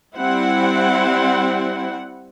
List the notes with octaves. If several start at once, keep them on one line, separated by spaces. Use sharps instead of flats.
G3 C4 E4 F#5